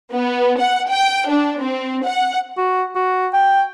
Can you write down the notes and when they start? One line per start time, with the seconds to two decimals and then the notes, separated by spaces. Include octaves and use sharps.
0.11 B3
0.60 F#5
0.91 G5
1.29 D4
1.61 C4
2.04 F#5
2.57 F#4
2.95 F#4
3.33 G5